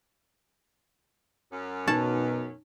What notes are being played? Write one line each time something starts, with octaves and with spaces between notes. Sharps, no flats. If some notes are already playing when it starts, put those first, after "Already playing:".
F#2 C#4
B2 D#4 A5 C#6